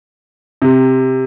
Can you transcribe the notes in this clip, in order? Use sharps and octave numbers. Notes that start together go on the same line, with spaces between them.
C3